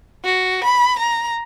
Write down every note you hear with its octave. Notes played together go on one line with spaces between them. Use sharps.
F#4
B5
A#5